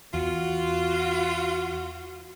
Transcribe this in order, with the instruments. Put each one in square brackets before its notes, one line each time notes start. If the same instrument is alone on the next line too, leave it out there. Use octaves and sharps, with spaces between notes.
[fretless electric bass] E2 [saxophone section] F4 F#4